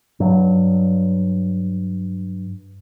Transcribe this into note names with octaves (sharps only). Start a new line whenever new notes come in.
G2 F#3